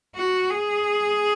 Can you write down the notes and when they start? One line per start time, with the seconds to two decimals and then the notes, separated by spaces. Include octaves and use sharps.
0.15 F#4
0.50 G#4